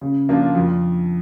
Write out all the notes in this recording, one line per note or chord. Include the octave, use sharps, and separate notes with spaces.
C#3
F3 A#3 D4 F4
F2